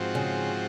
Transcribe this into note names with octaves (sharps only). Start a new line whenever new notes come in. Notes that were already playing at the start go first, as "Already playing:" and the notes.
Already playing: G#2 F3 C4 F#4
C#3